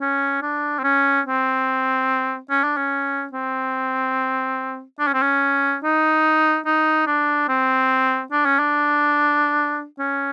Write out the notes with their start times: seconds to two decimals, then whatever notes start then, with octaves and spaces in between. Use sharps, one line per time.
0.01 C#4
0.42 D4
0.79 C4
0.84 C#4
1.26 C4
2.50 C#4
2.64 D4
2.77 C#4
3.33 C4
4.99 D4
5.07 C#4
5.14 C4
5.22 C#4
5.83 D#4
6.66 D#4
7.07 D4
7.48 C4
8.32 D4
8.46 C#4
8.59 D4
9.99 C#4